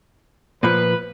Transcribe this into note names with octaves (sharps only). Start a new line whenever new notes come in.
A#2 F3 B4